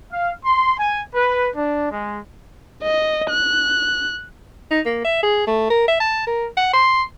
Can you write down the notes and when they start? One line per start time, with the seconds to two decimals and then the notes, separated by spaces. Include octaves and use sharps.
0.12 F5
0.45 C6
0.79 G#5
1.15 B4
1.56 D4
1.91 G#3
2.82 D#5
3.30 F#6
4.71 D#4
4.86 A#3
5.05 E5
5.23 G#4
5.47 A3
5.70 A#4
5.88 E5
6.00 A5
6.26 A#4
6.57 F#5
6.73 C6